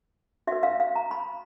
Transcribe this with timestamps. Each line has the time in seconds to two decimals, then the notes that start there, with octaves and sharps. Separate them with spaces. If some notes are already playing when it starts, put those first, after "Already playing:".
0.47 F#4 B4 E5
0.63 F5
0.80 F5
0.96 A#5
1.11 B5